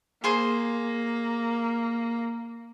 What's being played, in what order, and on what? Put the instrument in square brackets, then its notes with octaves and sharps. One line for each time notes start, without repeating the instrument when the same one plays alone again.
[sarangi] A#3 [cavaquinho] G#4 C5 C6